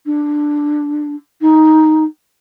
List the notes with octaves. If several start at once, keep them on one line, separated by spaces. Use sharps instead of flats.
D4
D#4